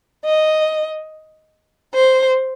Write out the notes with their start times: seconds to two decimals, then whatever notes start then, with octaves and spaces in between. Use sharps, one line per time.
0.25 D#5
1.94 C5